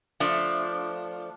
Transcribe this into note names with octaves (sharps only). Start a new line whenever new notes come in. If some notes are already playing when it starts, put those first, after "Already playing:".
F3 A3 D4